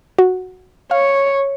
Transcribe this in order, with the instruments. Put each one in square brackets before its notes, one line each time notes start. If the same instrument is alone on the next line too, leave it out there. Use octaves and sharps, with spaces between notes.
[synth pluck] F#4
[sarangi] C#5 [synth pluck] F5